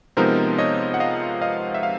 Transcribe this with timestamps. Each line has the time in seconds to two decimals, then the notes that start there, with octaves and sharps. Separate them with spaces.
0.17 C3 F3 G#3 B3 D#4 A#4 C5
0.59 C#5 D#5
0.94 F#5
1.00 D#5 F5
1.41 D#5 F5
1.74 E5
1.83 F5